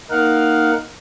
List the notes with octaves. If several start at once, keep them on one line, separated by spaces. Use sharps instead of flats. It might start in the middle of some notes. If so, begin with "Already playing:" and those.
A#3 D#4 A#4 F5 F#5